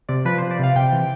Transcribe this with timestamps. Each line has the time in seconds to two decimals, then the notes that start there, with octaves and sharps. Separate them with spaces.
0.09 C3 D5
0.25 F3 B4
0.38 F3 C5
0.51 D5
0.59 C3 F5
0.76 C3 G5
0.92 E3